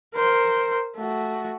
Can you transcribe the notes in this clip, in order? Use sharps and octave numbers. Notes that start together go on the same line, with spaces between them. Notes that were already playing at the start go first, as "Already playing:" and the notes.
A#4 C5
A3 F#4